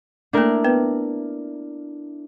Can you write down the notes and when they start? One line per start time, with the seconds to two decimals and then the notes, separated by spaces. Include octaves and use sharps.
0.33 A3 A#3 D4 E4 A#4
0.64 B3 B4